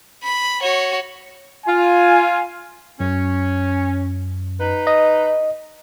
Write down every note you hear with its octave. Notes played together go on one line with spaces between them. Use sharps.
B5
F#4 C#5
F4 G#5
F#2 C#4
D#4 B4
D#5